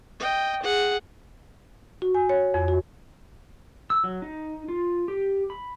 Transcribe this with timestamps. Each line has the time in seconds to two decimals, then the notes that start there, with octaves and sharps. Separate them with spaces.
0.20 D#5 G5
0.62 G#4 F#5
2.02 F#4
2.15 G#5
2.29 C#5
2.54 F2
2.68 F#4
3.90 E6
4.04 F#3
4.22 D#4
4.68 F4
5.08 G4
5.50 B5